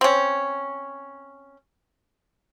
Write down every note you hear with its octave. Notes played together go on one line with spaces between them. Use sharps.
C4 C#4